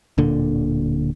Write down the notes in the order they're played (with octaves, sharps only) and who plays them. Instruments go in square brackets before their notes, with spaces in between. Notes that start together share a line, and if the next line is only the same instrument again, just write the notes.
[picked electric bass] D1 A#2 D3